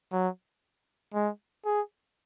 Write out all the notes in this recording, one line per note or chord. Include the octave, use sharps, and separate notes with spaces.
F#3
G#3
G#4